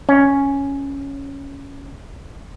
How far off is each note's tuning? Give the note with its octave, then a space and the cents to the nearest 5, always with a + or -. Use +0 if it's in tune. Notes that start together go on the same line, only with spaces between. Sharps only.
C#4 +0